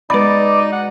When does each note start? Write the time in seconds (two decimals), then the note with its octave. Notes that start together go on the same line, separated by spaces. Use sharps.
0.10 B2 G#3 D#4 B4 D5 B5
0.72 F#5